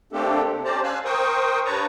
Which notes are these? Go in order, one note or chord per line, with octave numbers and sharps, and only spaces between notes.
A3 A#3 C4 D4 G4 A4
C3
C#4 G4 C5 D5 A5 A#5
F5 G#5 E6 F#6
A#4 C5 G5 C#6 D#6
G2 B4 C#5 A5 A#5 C#6